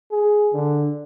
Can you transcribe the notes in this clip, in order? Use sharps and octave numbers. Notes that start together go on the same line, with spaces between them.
G#4
D3